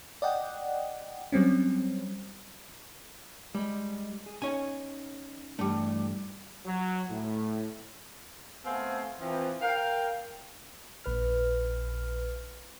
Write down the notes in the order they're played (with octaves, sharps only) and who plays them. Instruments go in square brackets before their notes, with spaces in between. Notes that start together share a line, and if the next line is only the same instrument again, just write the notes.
[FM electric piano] D5 D#5 F#5 G5
F#3 G3 C4 C#4
[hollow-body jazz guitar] G3 [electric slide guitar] G#3 D#5
[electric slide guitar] G#4
[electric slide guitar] C#4 D#4 [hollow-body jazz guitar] C#5 G#5
[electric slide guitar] G2 E3 D4 [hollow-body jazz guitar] G3 A3
[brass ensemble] F#3
A2
[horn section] A3 B3 C4 C5 F5 G#5
E3 F3 C4
A#4 F5 G5
[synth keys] A#1 B4 F6